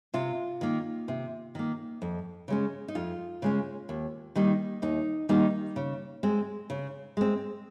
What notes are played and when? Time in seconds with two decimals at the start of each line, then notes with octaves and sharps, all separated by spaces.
0.14 C3 F4
0.61 D#3 A#3
1.08 C3
1.55 D#3 A#3
2.02 F2
2.48 C#3 G#3 C#4
2.88 D#4
2.95 F2 F4
3.42 C#3 G#3 C#4
3.89 D#2
4.35 D#3 G3 A#3 D#4
4.82 D#2 D#4
5.29 D#3 G3 A#3 D#4
5.76 C#3
6.23 G#3 C4
6.70 C#3
7.17 G#3 C4